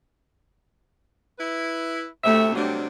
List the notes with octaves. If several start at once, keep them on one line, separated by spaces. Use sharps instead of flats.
E4 B4
D2 C3 A3 E5
C3 F#3 G3 D4